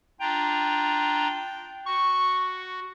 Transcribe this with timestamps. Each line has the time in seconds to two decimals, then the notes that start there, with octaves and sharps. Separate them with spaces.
0.20 D4 F4 G5 A#5
1.87 F#4 C#6